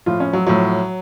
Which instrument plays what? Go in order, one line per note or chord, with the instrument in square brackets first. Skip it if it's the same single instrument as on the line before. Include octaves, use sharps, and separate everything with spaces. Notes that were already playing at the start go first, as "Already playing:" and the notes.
[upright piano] A2 F3 F4
C#4
F#3
A2 F3 F#3